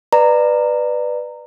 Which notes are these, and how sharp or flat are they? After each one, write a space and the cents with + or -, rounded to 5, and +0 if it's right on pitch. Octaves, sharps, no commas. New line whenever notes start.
B4 +0 D5 +20 A#5 -15